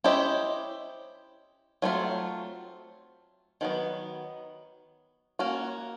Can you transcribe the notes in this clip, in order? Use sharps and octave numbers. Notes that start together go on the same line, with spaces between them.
C#4 E4 G4 C5 D#5
F#3 A3 C4 F4
D#3 F#3 B3
A#3 C#4 F#4